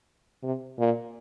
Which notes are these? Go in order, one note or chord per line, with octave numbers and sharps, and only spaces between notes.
C3
A#2